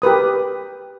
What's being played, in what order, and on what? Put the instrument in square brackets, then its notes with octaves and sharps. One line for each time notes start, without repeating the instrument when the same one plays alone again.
[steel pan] G4 A#4 B4 D#6